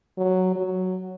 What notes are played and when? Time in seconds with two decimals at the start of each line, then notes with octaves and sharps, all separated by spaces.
0.18 F#3
0.56 F#3